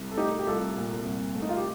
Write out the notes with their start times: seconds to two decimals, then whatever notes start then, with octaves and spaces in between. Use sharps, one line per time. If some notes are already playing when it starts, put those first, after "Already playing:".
Already playing: C2
0.11 A4
0.17 A3 D#4 G4
0.39 G4
0.46 C2 F4 A4
0.76 A#2
1.05 C2
1.35 A3
1.42 D#4
1.49 F4
1.56 G4